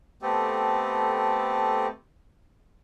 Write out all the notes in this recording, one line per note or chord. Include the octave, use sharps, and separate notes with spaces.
A3 B3 C4 G4 A4 D#5